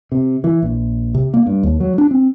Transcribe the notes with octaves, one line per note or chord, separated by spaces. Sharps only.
C3
E3
A#1
C3
A#3
G2
D#2
F#3
D4
C4